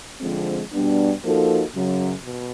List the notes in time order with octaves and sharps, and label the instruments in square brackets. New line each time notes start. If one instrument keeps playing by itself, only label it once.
[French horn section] D3 F3 G#3 C4
B2 G3 B3 D4
F3 A#3 D#4 F#4 A4
F#2 C#3 F#3
B2